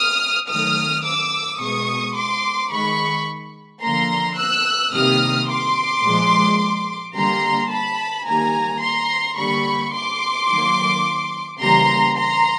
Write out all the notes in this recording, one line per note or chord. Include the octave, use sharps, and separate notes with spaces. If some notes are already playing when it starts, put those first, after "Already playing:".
Already playing: D#6 F6
D#3 F#3 A3 D#6 F6
D6 E6
B2 G#3 C#6 D#6
C6 D6
D#3 G#3 B5 C#6
D3 F3 A#3 A#5 C6
E6 F#6
C3 D#3 G3 A#3 D#6 F6
C6 D6
A#2 F3 G#3
D3 G3 A#3 A#5 C6
A5 B5
D#3 G3 A#3 G#5 A#5
A#5 C6
D3 G3 A#3 B5 C#6
C6 D6
D#3 F#3 A#3
C#3 E3 G3 A#3 A#5 C6
A#5 C6